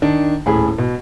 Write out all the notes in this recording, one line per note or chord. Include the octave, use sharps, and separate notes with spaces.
D#3 D4
D#1 A2 G#4 B5
B2